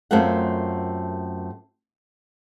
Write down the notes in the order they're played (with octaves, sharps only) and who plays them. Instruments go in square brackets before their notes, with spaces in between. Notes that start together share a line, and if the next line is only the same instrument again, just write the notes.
[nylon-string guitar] F#2 A3 C4 F4 A#4 F#5